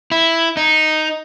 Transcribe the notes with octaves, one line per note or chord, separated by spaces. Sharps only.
E4
D#4